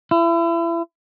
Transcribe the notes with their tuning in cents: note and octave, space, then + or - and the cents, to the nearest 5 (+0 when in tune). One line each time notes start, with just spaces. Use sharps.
E4 +35